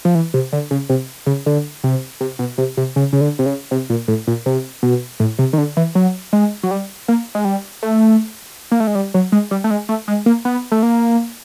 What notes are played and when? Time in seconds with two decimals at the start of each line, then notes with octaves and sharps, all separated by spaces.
0.05 F3
0.15 E3
0.34 C3
0.53 D3
0.71 C#3
0.89 C3
1.26 C#3
1.46 D3
1.84 C3
2.21 C3
2.39 B2
2.58 C3
2.77 C3
2.96 C#3
3.13 C#3
3.21 D3
3.39 C3
3.46 C#3
3.71 C3
3.90 A#2
4.08 A2
4.27 A#2
4.46 C3
4.83 B2
5.20 A2
5.39 C3
5.53 D#3
5.58 D3
5.77 E3
5.95 F#3
6.33 G#3
6.63 F#3
6.71 G3
7.08 A#3
7.35 G#3
7.45 G3
7.83 A3
8.72 A#3
8.80 A3
8.87 G#3
8.95 G3
9.14 F#3
9.32 G#3
9.51 G3
9.64 A3
9.71 G#3
9.89 A3
10.08 G#3
10.26 A#3
10.45 B3
10.72 A3
10.83 A#3